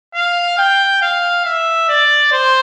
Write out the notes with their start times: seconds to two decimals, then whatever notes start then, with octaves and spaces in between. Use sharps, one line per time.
0.14 F5
0.58 G5
1.02 F5
1.45 E5
1.89 D5
2.32 C5